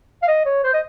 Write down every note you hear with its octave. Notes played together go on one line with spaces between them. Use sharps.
F5
D#5
C#5
C5
D#5